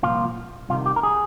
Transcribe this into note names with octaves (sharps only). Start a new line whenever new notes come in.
C2 A#2 F3 F4
C2 C3 D#3 F4
G4
A#4
G#4